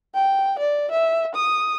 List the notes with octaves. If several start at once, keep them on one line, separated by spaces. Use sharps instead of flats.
G5
D5
E5
D#6